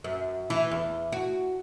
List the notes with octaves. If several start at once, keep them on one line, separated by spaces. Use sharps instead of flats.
F#2
E3
E2
F#4